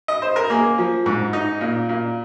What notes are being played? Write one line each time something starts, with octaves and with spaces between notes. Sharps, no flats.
D#5
C5
A#4
A#3 G#4
F3
G#2
D#4
A#2
A#2